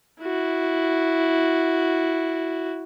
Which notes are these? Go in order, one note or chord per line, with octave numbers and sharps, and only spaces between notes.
E4 F#4